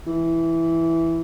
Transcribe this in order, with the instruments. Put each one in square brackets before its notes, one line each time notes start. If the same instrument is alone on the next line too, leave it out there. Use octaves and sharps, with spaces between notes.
[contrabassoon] E3